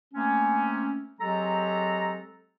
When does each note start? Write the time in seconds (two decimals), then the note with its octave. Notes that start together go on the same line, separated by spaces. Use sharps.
0.14 A3 A#3 C4 C#4
1.20 F#3 G#3 C4 G4 A4 A#5